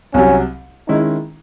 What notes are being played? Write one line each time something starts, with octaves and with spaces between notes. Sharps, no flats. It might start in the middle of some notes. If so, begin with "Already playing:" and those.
C2 C3 F#3 C#4
D#3 G#3 C#4 D#4 E4